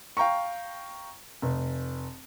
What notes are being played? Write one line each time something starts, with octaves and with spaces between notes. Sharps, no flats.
F5 G5 A#5 C#6
F1